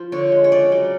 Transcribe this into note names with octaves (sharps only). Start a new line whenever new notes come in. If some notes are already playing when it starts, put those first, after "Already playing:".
Already playing: F3 F4
D3 C#5
G#3
C#5
C#3 D5
F#3